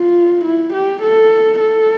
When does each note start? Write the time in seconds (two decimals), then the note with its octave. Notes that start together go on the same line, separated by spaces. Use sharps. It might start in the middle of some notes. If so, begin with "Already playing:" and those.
Already playing: F4
0.45 E4
0.73 G4
1.02 A4
1.60 A4